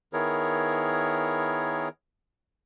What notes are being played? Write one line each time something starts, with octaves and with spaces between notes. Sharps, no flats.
D#3 B3 E4 G#4 A#4 C#5